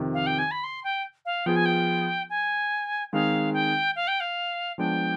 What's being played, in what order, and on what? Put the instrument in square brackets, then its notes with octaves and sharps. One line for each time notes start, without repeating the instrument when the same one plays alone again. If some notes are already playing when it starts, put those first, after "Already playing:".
Already playing: [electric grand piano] F2 C3 D#3
[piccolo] F5
G5
G#5
B5
C6
G5
F5
[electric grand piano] F3 B3 F4 G#4 [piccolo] G5
[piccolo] G#5
G5
G#5
[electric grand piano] D#3 G#3 C4 D#4 G#4 [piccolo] F5
[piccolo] G5
F5
G5
F5
[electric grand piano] F3 G#3 B3 D4 [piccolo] G5